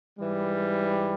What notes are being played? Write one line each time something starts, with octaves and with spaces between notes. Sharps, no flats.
G#2 E3 G3